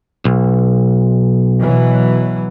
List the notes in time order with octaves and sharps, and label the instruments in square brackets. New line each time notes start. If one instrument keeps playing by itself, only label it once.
[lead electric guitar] B1
[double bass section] B2 E3 F#3